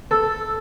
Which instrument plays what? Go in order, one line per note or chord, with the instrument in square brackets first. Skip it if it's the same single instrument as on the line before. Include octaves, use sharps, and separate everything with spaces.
[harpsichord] A4